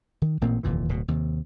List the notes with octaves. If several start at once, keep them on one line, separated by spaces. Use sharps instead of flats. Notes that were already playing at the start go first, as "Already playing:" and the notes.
D#3
A1 A#2 A#3 C4
F1 D#2 A#2 E3
D1 B2
D#2 C3